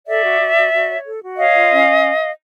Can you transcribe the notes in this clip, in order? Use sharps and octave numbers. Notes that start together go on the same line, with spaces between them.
A4 D5 E5
F#4
F#4
F#4
F#4
C#5
A4
F#4
C#5 D#5 F5
F4
C#4